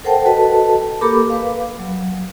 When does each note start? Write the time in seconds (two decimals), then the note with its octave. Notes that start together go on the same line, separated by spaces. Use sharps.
0.04 A4 A#4 C5 F#5 G5 A5
0.25 F#4 A4 B4 D#5 A5
1.01 A#3 G4 A4 A#4 B5 D6
1.30 B4 F5
1.79 F#3